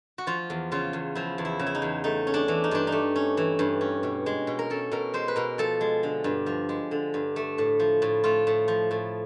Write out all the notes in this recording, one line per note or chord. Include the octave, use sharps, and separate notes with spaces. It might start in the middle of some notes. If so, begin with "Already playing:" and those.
F#4
F3 F4
E2
C#3 F4
E2
F3 E4
E2
E4
C#3
E4
D#4
E2
A3 D#4
C#4
D4
E3
D#4
G2 D4
D#4
A3
C#4
E3
G2
C#4
B2
G#3
B2
A#4
C#4 A4
B2 A#4
G#3 C5
B4
B2 A#4
F3 A4
G#3
D3
G2
F3
G#3
D3
G2
A3
A2
F3
A2
A3 F4
A2
F3
A2